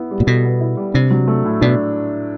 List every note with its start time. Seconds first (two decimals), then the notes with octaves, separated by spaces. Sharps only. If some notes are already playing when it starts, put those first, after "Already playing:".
Already playing: B3 E4
0.11 G3
0.20 A#2
0.27 B2 A4
0.45 B3
0.61 E4
0.77 G3
0.94 C3 D4
1.11 F#3
1.27 A3
1.45 A2
1.61 B2 D4